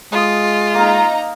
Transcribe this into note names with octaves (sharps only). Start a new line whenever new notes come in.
G#3 F4 C6 D#6
A#3 D#4 A#4 A#5